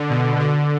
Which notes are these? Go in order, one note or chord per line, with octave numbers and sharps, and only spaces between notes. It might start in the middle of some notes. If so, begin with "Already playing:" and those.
Already playing: D3
B2
D3